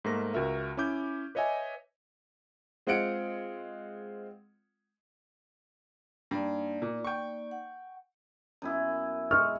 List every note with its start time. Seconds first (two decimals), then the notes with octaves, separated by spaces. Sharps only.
0.04 G#2 A3 A#3 A#6
0.34 C#2 F#4 A#4 E5
0.77 C#4 E4 D6 G6
1.35 B4 C#5 D#5 E5 G#5
2.87 G#3 C4 F4 F#5 C#7 D7
6.31 G2 A#3 D#4 D5
6.82 A#2
7.05 G5 C#6
7.51 F#5
8.62 F#2 B3 E4
9.31 G#3 C#6 F6